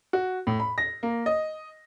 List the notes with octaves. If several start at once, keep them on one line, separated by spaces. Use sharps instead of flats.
F#4
A2
B5
A#6
A#3
D#5